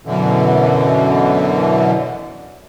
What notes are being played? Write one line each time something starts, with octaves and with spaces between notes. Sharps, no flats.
F#2 B2 D3 E3